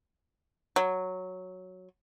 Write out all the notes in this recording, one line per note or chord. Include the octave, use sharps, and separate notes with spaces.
F#3